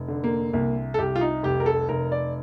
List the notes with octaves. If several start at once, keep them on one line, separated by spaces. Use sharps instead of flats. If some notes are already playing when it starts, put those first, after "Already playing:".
Already playing: F1
D3
A#3
C2 A#3
A4
C2 G4
F4
D#4
F1 G4
A#4
A4
F1 A#4
D5